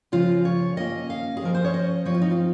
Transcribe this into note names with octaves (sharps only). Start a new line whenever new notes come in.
C#3 F3 G#3 F4
C#5
D#3 A#3 C#4 D#5
F5
G#4
F3 G#3 C#4 A#4
C5
C#5
D#5
F3 C4 F4 C#5
D#4
F4